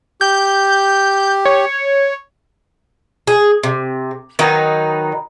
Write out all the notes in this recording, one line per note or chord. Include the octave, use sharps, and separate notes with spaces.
G4 G6
C#5
G#4
C3
D#3 F#3 D#4 B4